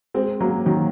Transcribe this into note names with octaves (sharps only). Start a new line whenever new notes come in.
G#3 C4
F#3 A#3
D#3 F#3